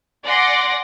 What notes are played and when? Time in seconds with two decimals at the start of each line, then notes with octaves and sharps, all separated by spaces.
0.24 D5 F#5 G#5 C6 D6 A#6